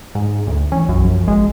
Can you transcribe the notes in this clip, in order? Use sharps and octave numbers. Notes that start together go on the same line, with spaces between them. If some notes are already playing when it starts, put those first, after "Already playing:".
G#2
D2
E3 C#4
B1 F#2
F3
G#1 G#3